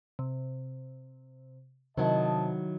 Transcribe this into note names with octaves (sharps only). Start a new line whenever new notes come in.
C3
C3 D#3 F#3 E4 D#5 A5